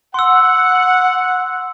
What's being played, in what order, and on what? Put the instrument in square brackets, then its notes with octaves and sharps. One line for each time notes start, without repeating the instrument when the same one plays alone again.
[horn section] F#5 [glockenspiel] C6 E6